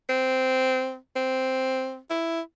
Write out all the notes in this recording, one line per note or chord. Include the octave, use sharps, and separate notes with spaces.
C4
C4
E4